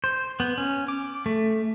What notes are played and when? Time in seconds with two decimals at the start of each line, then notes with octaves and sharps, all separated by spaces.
0.04 C5
0.40 B3
0.58 C#4
0.88 D6
1.26 A3